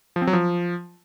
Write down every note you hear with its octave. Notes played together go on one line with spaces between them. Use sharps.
F3
C4
F#3
F3